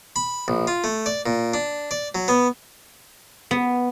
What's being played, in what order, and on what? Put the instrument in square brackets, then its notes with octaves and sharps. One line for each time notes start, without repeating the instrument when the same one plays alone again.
[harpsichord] B5
A#1
F4
A3
D5
A#2
D4
D5
F#3
B3
[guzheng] B3